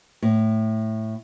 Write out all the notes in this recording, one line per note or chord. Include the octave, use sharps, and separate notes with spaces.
A2